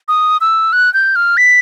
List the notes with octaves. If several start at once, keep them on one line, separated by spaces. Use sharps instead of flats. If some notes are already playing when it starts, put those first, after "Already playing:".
D#6
E6
F#6
G6
F6
B6